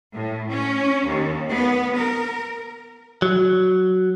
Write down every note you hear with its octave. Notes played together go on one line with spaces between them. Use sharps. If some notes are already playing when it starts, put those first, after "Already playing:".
A2
C#4
D#2
B3
A#4
F#3